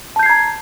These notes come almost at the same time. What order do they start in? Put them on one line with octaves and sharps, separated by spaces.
A5 G6 C7 G#6 A#5